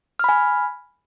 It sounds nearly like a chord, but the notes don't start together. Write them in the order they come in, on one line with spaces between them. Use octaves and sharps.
F6 B5 G#5